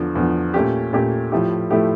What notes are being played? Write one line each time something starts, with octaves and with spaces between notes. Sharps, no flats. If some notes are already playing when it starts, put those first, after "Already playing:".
Already playing: E2 D3 F3
E2 D3 F3
A#2 A3 C#4 G4
A#2 A3 C#4 G4
A2 F3 A3 E4 G4
A2 F3 A3 E4 G4